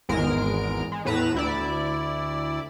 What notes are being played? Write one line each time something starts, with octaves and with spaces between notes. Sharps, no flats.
G#1 E2 G#3 A#4 F6 D7
G#3
E2 A2 B4 A#5 E7
D2 E4 D5